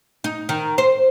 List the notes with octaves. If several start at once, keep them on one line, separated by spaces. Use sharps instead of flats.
D#4
D#3
C5